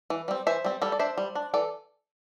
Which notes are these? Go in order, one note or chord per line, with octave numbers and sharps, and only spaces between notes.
E3
G3 C4
E3 C5 E5
G3 C4
G3 A4 D5
D5
D4 C5 E5
G3
D4
E3 A4 D5